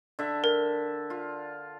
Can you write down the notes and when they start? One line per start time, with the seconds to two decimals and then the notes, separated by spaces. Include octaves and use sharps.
0.19 D3 E5
0.44 A#4
1.10 F4